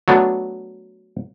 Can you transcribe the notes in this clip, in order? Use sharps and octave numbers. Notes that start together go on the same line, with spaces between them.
F#3 A3 B3 D4